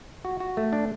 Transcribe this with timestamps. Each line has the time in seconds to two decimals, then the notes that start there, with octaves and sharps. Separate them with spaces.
0.25 F#4
0.40 F#4
0.57 A3
0.73 D4